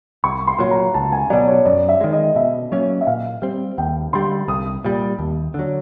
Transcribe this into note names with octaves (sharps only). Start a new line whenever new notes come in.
C2 C#6
C6
A#2 F#3
A#5
C#2 A5
G#5
B2 F#3 D5
C#5
F#2 D5
E5
D#3 G#3
D#5
B2 E5
F#3 A#3 C#4
E5
A#2 F5
G3 C4
D#2 G5
D3 G3 C6
C2 D#6
A#2 G3
D#2
D3 F#3